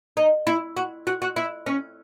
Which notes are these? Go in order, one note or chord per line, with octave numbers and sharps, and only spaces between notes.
D#4
E4
F#4
F#4
F#4
E4
C#4